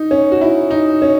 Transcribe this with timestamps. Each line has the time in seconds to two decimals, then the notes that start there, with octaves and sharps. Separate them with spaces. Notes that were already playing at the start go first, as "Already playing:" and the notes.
Already playing: D#4
0.11 C#4
0.32 F#4
0.41 E4
0.71 D#4
1.02 C#4